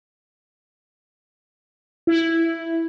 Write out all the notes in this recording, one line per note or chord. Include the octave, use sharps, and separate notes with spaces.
E4